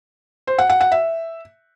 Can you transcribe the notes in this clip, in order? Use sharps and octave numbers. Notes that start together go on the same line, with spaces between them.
C5
F#5
F#5
F#5
E5